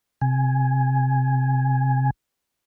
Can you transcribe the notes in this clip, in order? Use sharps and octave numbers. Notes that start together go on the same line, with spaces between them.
C3 G#5